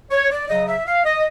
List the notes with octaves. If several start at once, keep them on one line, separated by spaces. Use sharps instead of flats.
C#5
D5
C#3 F#3 D#5
E5
F5
D#5